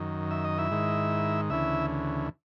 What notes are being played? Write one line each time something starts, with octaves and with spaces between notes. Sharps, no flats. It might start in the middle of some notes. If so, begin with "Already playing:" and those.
Already playing: F#2 D#3
E5
D#5
E4 E5
G#2 D#3
D2 C#3 E3 E4 E5